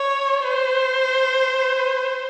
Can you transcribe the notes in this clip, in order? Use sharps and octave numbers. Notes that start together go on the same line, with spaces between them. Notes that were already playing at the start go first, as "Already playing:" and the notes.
Already playing: C#5
C5